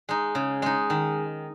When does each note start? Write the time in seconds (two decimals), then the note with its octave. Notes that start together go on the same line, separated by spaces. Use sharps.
0.09 G#3 D#4
0.35 C#3
0.62 G#3 D#4
0.90 D#3